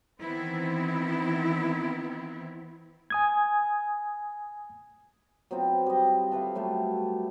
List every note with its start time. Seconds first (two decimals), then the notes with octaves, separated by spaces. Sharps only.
0.21 D#3 E3 B3 C4 E4
3.10 G#5 D#6 G#6
5.51 F#3 B3 C4 F4
5.86 G3 D#5
6.32 A4 B4 E5 F5
6.55 F#3 G3 A3 B3